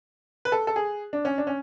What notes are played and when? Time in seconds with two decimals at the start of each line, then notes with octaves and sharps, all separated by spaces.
0.45 B4
0.52 A4
0.67 A4
0.76 G#4
1.13 D4
1.25 C#4
1.38 D4
1.47 C#4